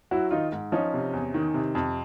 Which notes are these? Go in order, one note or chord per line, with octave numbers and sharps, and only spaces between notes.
F#3 E4 F#4
D#3 D#4 F4
G#2
F3 C#4 D#4
C3
E2
D#3
C3
F2